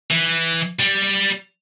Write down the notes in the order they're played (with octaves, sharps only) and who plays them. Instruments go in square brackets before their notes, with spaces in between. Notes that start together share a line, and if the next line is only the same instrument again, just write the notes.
[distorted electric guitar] E3
G3